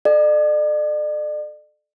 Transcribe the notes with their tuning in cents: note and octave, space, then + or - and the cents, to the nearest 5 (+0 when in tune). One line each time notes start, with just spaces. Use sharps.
A4 -20 D5 +40